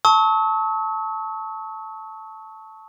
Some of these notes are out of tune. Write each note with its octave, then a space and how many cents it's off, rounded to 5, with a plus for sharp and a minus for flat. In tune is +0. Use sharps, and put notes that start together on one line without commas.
A5 +0 C#6 +0 E6 -45